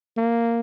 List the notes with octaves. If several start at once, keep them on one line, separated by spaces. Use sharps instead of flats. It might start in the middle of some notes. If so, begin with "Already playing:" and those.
A#3